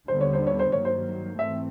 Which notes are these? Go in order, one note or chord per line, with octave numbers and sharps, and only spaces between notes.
D#2 D3 G3 B3 C5
C#5
C5
C#5
C5
G2 D#3 F#3 A#3 C#5
C5
G#2 E3 A3 C4 E5